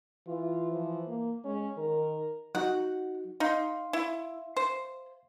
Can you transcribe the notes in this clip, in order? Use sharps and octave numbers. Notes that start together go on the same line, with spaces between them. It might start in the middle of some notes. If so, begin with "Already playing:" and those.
E3 F4
F3
A#3
G#3 C#4
D#3 A#4
F#3 D#4 F#4 F#5
D#4 F5 C6
E4
C5